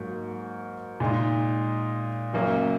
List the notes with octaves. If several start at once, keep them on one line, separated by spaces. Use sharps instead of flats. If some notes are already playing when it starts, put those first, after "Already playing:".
Already playing: G#2 F#3 A#3 F#4 A#4
A#2 G#3 D#4
F#1 F#2 F#3 A#3